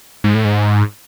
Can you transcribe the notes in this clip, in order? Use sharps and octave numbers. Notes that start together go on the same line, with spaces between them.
G#2
A2
G#2